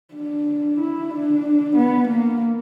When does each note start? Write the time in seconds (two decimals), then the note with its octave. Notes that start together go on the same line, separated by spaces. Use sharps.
0.15 D4
0.79 E4
1.11 D4
1.76 B3
2.08 A#3